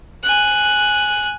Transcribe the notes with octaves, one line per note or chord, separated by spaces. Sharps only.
G#5 F#6